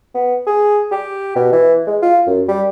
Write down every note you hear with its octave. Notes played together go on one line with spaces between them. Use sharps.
B3
G#4
G4
B2
E3
G#3
F4
F#2
G3